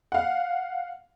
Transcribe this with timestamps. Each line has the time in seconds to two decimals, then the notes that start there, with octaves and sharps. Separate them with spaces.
0.12 F5 F#5